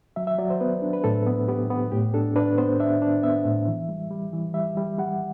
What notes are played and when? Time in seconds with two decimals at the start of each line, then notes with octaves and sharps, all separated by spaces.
0.16 F#3 E5
0.27 E5
0.38 F#3 D5
0.50 C5
0.60 B3 B4
0.82 D4
0.93 B4
1.04 A2 A4
1.27 B3
1.48 B3 G4
1.70 B3
1.92 A2 G4
2.14 D4 A4
2.36 D4 B4
2.58 B3 C5
2.80 D4 E5
3.02 D4
3.23 B3 E5
3.45 A2
3.68 E3
3.89 G3
4.10 G3
4.33 E3
4.54 G3 E5
4.77 G3
4.98 G3 F#5